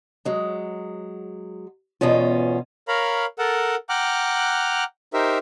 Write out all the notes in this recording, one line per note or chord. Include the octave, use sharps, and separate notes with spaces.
F#3 G#3
E2 G#2 B2 C#4 F4
A#4 C#5 F5 A#5 B5
A4 A#4 F#5 A5
F#5 G5 A#5 D6 F6 F#6
D#4 G4 A#4 C5 E5